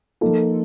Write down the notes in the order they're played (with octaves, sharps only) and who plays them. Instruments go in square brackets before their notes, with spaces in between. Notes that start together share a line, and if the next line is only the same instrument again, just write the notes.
[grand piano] F3 A#3 D#4 [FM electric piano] F4 A4